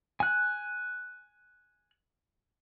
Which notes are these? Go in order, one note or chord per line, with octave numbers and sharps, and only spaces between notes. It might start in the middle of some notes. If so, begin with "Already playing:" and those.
G#5 F#6